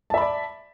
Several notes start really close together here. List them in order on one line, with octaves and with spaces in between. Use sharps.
A5 E5 B5 D5